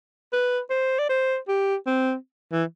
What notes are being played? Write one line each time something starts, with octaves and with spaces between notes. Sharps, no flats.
B4
C5
D5
C5
G4
C4
E3